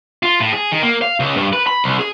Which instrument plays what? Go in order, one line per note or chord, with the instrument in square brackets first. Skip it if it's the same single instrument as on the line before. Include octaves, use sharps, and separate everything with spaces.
[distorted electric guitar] F4
A2
G#4
D#3
A#3
F5
C#2
G2
B4
B5
C2
G#4